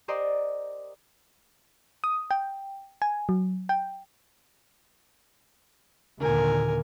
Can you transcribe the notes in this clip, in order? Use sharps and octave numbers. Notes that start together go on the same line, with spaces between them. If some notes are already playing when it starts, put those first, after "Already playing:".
G4 A#4 C5 D5 D#5
D#6
G5
G#5
F#3
G5
D#2 A#2 D3 A#4 G#5